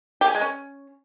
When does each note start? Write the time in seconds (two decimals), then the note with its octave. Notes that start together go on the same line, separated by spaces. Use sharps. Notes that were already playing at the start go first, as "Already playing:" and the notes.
0.21 G4
0.28 G#4
0.35 G#3
0.41 C#4